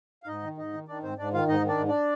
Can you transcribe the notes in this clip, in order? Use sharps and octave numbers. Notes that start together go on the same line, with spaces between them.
F5
G#2 D#4 D#5
D#3
G#2 D#4 D#5
D#3
D#3 D4 D5
G#2 C4 C5
G#2 D4 D5
D#3 F4 F5
G#2 D#4 D#5
D#3
D4 D5
G#2
D4 D5